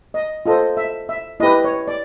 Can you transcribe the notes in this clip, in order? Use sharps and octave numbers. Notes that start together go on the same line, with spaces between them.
D#5
F4 A4 C5 D#5
E5
E5
E4 G4 B4 D#5
C#5
D5